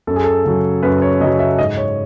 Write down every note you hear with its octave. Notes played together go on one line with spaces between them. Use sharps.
F#2 A4
G#4
A4
C#3 F#3
F#2 B4
C#5
C#3 F#3 D#5
E5
G#2 D#5
C#5